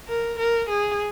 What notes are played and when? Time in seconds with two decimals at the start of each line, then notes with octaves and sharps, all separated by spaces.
0.08 A#4
0.39 A#4
0.69 G#4